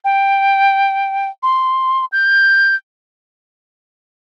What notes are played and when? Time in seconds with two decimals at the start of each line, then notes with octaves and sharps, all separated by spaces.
0.04 G5
1.43 C6
2.12 G6